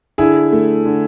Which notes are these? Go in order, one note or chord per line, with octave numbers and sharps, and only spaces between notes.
D3 E4 G#4
A3
D3